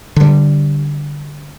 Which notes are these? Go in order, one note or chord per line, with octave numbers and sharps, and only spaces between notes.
D3 G3